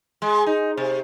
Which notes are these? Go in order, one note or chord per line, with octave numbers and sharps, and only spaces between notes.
G#3
D#4
C3